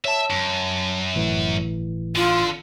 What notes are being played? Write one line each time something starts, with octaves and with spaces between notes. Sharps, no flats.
C#5 E5 A5
F#2
G1 A2 E3
D3 F4